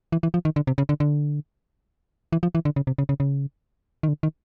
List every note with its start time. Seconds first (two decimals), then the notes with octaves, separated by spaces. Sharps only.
0.12 E3
0.23 E3
0.34 F3
0.45 D#3
0.56 D3
0.67 C3
0.78 C#3
0.89 D3
1.00 D3
2.32 E3
2.43 F3
2.55 E3
2.65 D3
2.76 C#3
2.87 C3
2.98 C#3
3.09 C#3
3.20 C#3
4.03 D#3
4.08 D3
4.23 D#3